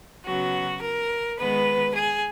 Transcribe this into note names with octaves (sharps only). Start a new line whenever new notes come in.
C#3 F#3 B3 F#4
A#4
D#3 G#3 B3 B4
G#4